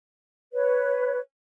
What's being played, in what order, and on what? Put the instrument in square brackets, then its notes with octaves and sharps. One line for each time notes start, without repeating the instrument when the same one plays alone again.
[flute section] B4 C#5